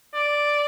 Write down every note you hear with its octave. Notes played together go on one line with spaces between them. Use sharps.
D5